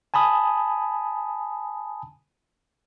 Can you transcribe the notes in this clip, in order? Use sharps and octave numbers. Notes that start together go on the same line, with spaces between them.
G#5 A5 B5 D#6